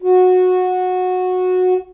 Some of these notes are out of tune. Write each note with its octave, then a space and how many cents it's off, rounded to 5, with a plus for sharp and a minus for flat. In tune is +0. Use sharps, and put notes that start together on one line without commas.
F#4 -15